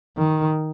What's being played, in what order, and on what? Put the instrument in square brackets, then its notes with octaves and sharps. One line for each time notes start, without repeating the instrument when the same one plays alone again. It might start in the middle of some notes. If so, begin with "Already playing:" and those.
[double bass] D#3